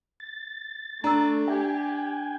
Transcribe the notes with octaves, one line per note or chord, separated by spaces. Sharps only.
A6
A3 D4 A#5 E6
G4 E5 G5 G#5